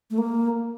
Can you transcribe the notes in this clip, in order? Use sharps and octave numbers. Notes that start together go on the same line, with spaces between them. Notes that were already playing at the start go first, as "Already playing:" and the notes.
A3
A#3